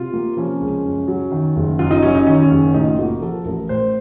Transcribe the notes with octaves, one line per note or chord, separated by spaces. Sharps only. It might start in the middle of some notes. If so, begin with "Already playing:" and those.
Already playing: C3 F4
A#3
F3 C#4
C#2
F#2
F#3
D#3
F#1
F#2 F4
D#4
F#3 C#4
D#4
D#3 C#4
C#4
F#1
A2 D#4
F4
A#3 F#4
F3 A4
A1 A#4
A2 C5